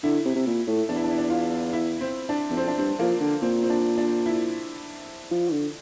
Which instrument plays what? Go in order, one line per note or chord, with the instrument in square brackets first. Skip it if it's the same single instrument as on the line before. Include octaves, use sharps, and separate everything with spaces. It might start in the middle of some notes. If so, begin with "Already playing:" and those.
[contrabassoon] D3 [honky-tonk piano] E4
[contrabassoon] C3
C3
A#2
A2
[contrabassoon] E2 [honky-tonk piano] D4
[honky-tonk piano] E4
D4
E4
D4
F4
E4
C4
D4
[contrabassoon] E2
[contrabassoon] F2 [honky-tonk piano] C4
[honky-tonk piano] D4
[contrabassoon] G2 [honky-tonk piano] C4
[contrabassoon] F3 [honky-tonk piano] A#3
[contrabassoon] D3
[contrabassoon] A#2 [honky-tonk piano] C4
[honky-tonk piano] C4
D4
D4
E4
[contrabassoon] F3
E3
D3